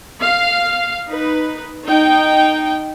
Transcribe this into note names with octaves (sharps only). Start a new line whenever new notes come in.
F5
D#4 B4
D#4 G5